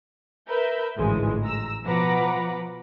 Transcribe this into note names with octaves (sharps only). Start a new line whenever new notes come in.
A#4 B4 E5 G6
A1 D2 G#2 E3 F3 G#3
A#5 E6
B2 F3 B4 F#5 A#5 D6